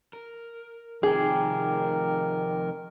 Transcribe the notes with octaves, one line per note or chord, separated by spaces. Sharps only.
A#4
C3 D#3 F3 G#4 A#4 G5 D6